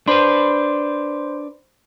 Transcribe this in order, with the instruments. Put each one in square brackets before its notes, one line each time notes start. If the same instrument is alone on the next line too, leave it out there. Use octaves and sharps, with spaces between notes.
[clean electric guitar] D4 B4 [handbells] C5 B5 C6